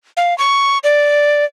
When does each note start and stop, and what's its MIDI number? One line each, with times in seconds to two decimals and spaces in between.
0.17 0.37 77
0.38 0.78 85
0.84 1.45 74